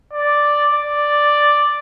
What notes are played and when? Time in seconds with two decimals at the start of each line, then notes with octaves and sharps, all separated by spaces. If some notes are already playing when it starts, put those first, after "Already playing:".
0.13 D5
0.73 D5